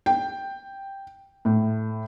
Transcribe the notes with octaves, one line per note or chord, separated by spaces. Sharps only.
G5
A2